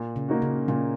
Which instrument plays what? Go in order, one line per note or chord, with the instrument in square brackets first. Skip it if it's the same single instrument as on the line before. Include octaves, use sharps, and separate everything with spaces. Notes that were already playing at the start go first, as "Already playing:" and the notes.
Already playing: [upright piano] A#2
[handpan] C#3
[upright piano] A#3 D#4 F#4
[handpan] C#3
[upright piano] A#2 [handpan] C#3